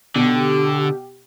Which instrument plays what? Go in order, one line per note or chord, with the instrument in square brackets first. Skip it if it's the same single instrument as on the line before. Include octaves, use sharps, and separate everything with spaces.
[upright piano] B2 [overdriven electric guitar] D3 [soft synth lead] G4